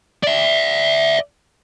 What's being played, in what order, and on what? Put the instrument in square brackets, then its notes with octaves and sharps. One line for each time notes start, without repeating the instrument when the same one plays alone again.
[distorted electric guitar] D5 E5